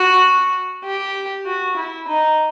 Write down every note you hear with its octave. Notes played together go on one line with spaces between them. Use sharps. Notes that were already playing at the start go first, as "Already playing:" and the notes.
Already playing: F#4
G4
F#4
E4
D#4